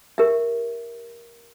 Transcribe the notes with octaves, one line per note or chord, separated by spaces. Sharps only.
G4 A#4 E5